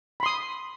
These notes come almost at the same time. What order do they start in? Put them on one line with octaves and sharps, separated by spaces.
B5 C6 D#6